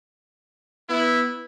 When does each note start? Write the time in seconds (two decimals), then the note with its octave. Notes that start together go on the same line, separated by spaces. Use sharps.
0.88 B3 E4